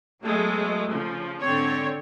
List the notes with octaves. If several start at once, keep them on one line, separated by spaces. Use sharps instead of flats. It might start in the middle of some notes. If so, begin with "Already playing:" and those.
F#3 G#3 A3 B3
C#3 F3
G#2 D3 C4 C#5